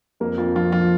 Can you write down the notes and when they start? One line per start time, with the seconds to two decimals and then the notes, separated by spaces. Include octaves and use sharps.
0.20 F2 A#3
0.38 F2 F4
0.55 F3 F4
0.72 F3 F4